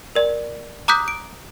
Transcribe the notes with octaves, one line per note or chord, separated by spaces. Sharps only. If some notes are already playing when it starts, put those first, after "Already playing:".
A#4 D5
A#5 D6 D#6 F#6 G6 B6
D7